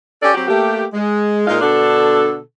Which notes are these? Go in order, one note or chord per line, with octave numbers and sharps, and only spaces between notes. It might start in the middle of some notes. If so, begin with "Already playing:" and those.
C#4 G4 A4 D5
F#3 C4 F#4 G4
A3 A#3 G4
G#3
A#2 G#3 D#4 F4 A#4 F5
B2 D3 D4 A4